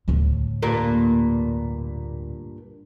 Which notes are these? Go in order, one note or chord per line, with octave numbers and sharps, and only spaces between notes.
D2 A2
G2 A#2 A#3